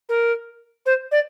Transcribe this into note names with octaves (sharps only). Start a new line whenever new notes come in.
A#4
C5
D5